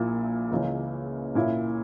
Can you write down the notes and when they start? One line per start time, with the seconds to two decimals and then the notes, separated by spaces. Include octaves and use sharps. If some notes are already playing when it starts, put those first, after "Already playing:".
Already playing: A#1 A#2 A#3 E4
0.51 C#2 C#3 E3 A#3 C#4
1.35 A#2 A#3 C#4 E4